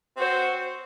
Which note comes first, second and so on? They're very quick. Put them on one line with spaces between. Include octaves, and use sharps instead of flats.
C4 F#4 C5